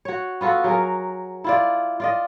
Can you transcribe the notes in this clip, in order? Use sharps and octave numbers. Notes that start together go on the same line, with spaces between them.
F#4 C#5
B3 F4 F#4 A4
F#3 G#4 A#4
E4 F4 D5
F4 D5 D#5